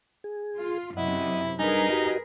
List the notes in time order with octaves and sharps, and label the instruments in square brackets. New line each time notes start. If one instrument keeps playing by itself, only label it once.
[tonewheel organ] G#4
[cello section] F4
[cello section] F#2 C3 [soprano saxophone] E4 [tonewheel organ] D#5 F#5
[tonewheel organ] G3 D4 G#5 [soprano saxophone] D#4 [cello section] G#4 A#4 B4
[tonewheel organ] F#4 G4 D#5